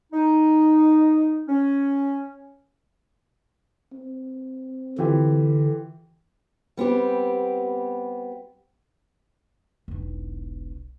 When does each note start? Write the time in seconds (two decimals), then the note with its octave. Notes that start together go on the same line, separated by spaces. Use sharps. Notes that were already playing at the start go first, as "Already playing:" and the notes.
0.13 D#4
1.48 C#4
3.93 C4
4.98 D3 E3 F4 G4
6.77 G3 B3 C4 G4
9.88 E1 B1